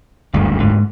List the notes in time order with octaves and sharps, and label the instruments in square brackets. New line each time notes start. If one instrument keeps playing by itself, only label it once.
[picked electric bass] F#1 D2 [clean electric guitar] G2
[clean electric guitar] G#2